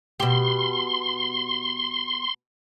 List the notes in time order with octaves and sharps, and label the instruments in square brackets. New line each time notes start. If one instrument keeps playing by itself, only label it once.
[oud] B2 G4 [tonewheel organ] C6